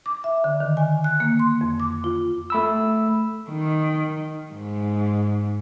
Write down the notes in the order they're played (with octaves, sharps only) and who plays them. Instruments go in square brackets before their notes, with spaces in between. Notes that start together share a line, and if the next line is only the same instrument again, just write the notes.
[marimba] D6
E5
D3
D#3
G#5
F#6
A#3
C6
F2
D6
F4
[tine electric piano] A3 B5 E6
[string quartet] D#3
G#2